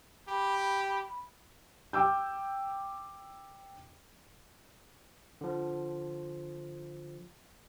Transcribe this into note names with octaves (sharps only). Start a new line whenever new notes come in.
G4 B5
G5 D6 E6 G6
D3 F3